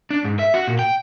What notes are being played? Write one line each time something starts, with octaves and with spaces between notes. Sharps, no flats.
D4
G#2
E5
F#4
A#2
G5